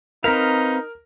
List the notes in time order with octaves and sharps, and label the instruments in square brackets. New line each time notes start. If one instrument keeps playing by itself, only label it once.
[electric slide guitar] C4 B4 F5 [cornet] D#4 [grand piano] A#4